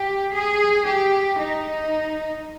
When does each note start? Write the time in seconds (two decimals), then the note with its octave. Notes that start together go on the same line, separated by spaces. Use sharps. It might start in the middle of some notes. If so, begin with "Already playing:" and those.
Already playing: G4
0.34 G#4
0.86 G4
1.39 D#4